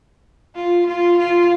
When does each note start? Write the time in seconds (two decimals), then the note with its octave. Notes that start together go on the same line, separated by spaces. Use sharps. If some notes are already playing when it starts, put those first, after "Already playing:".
0.56 F4
0.87 F4
1.18 F4